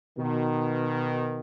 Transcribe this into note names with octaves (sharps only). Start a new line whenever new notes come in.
B2 D#3